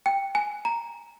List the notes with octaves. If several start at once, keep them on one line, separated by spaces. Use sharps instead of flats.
G5
G#5
A#5